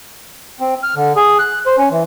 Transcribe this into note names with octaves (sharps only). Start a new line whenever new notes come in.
C4
F6
D3
G#4
F#6
C5
C#4
E3